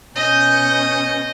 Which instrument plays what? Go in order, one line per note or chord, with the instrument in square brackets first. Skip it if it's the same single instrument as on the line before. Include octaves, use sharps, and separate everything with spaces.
[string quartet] B2 C#4 G6 [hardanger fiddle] D#5